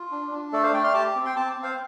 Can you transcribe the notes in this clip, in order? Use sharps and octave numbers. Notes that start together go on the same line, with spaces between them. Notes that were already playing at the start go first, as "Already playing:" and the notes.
Already playing: F4
D4
D4
A3 A4 D5
C5 F5
A3 D5 G5
C6 F6
G4 A5 D6
C4
G5 C6
C4 A5 D6
C4
C5 F5